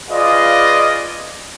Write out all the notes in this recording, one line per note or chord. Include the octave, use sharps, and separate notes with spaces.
F4 G#4 B4 D5 D#5 F5